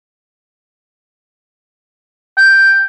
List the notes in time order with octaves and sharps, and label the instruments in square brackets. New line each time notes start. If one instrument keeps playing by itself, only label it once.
[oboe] G5